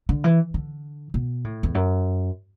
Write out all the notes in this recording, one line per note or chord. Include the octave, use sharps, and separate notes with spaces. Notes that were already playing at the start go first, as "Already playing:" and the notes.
D3
E3
D3
B2
A2
E2
F#2